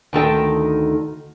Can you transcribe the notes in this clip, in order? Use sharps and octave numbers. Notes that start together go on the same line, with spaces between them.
D2 D#3 A4 G5